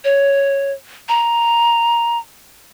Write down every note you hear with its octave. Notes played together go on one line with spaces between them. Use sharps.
C#5
A#5